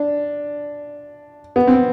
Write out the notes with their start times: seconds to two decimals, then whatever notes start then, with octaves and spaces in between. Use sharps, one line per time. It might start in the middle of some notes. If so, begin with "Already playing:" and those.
Already playing: D4
1.56 B3
1.67 C4